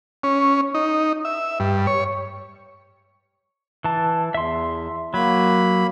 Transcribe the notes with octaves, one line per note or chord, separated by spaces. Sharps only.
C#4
D#4
E5
G2
C#5
E3 A5
E2 E5 C6
F#3 A#3 B5